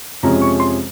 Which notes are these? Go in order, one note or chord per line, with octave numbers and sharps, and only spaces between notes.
F2 C3 F3 G#3 C#4 A#5
C#6
C6